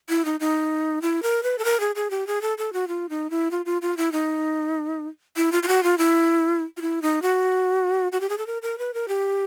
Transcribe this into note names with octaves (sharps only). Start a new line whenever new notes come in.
E4
D#4
D#4
E4
A#4
B4
A4
A#4
G#4
G#4
G4
G#4
A4
A4
F#4
F4
D#4
E4
F4
F4
F4
E4
D#4
E4
F4
F4
F#4
F4
E4
F4
E4
D#4
F#4
F#4
G4
G#4
A4
A#4
A#4
B4
A#4
G4